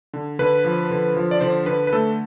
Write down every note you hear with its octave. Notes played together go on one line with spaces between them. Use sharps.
D3
D3 B4
F3
D3
F3
D5
D3 C5
D3 B4
B4
A3 A4